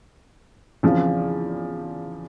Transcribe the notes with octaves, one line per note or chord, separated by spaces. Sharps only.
E2 C#3 F3 C4 F4